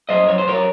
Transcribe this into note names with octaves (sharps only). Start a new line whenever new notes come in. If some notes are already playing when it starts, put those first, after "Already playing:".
F#2 C5 D#5
F#2 C#5
C5
F#2 A#4 C#5